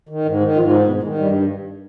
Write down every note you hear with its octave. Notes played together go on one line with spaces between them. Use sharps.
D#3
G#2
D#3
G#2 F3 F4
F4
D#3 D#4
G#2 B2 B3
G#2 D#3 G#3
G2 G3